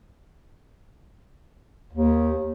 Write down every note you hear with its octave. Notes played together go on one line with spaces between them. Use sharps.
D#2